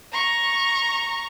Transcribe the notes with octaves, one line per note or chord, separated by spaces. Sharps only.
A#5 C#6